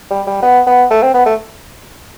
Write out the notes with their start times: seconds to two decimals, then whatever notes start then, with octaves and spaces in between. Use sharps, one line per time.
0.10 G3
0.27 G3
0.42 B3
0.66 B3
0.90 A3
1.02 C4
1.14 B3
1.26 A3